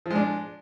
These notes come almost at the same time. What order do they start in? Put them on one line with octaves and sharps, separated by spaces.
F3 G#3 D4